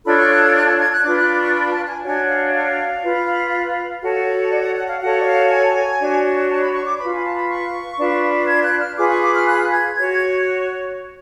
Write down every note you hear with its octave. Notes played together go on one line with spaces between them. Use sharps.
D4 F4 A4 C#5 B5
C#6
F#6
G#6
F#6
A5
G#6
F#6
D4 F4 B4 D6
F#6
D6
C#6
B5
A5
G#5
D4 F#4 C#5 G#5
F5
D5
F5
F4 B4
F#4 A4 C#5
D5
F#5
F#5
F5
F#4 A4 C#5 F#5
D5
F5
G#5
D4 F#4 C#5
A5
B5
C#6
D6
F4 B4 B5
G#5
A5
B5
C#6
D4 F4 B4
G#6
F#6
F6
F4 G#4 B4 D6
C#6
D6
F6
F#6
G#6
F#4 C#5 G#6
G#6